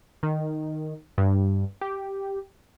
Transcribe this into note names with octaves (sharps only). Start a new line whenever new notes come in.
D#3
G2
G4